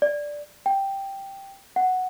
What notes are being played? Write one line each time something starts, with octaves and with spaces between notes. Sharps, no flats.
D5
G5
F#5